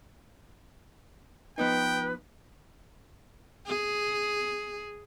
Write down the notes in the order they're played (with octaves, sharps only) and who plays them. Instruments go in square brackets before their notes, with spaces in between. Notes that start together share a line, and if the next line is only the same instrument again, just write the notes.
[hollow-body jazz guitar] F3 B3 D#4 [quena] B4 [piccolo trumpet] G5
[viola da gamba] G#4